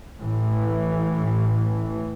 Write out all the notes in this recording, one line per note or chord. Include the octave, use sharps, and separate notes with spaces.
A1 A2 E3